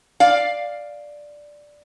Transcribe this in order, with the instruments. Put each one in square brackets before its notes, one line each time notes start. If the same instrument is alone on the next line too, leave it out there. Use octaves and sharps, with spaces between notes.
[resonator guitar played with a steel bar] D5 F5